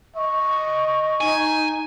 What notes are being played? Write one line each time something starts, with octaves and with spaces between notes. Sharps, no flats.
D#5 C#6
D#4 G#5